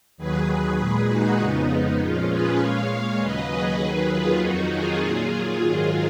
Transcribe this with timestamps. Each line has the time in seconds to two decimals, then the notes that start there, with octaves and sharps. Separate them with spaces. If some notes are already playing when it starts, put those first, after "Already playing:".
0.17 D#2 D#3 F#3 G#4 B4
0.77 A#2 G#3
1.08 D#4 F#4
1.38 F2 C#3 G#3 B3 D#4
1.98 A#2 F3 G#3 C#4 F4
2.28 G#4 B4
2.59 A#2 G#3 C#5 F5
2.89 C#5 F5
3.19 D#2 C#3 F#3 B4 D#5
3.49 G#4 B4
3.79 D#2 D#3 F#3
4.09 F4 G#4
4.39 F2 D#3 F#3 D#4 F#4
4.70 F4 G#4
5.00 A#2 F#3
5.60 G#2 D#3 F#3